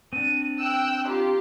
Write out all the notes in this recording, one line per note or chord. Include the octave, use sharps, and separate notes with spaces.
C4 D4 D#7
G5 E6 F#6 E7
F4 G4 A#5